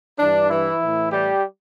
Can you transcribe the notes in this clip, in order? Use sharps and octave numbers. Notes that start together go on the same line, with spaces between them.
G2 E3 D4
E3 E4
A2 E3
G3 G4